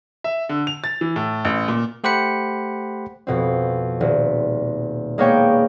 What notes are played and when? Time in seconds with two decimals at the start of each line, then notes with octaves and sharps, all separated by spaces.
0.24 E5
0.49 D3
0.67 F7
0.84 A6
1.01 E3
1.16 A2
1.45 A1
1.68 A#2
2.04 A3 G4 C5 F#5 B5 C#7
3.27 F2 B2 C4
4.00 D#1
5.18 G#3 A#3 B3 C#5 G5